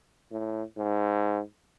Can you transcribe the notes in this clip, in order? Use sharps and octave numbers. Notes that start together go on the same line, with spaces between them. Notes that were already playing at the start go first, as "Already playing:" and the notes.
A2
G#2